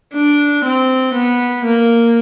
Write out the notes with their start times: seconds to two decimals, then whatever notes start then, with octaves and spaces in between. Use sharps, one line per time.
0.14 D4
0.65 C4
1.14 B3
1.65 A#3